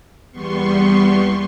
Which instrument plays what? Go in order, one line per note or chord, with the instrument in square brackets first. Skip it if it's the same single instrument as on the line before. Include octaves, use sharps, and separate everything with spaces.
[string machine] E2 G3 B3 C6 C#6